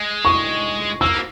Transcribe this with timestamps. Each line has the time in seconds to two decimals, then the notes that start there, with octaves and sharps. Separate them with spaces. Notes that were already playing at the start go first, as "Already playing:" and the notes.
Already playing: G#3
0.25 C#6
1.01 A#3 E6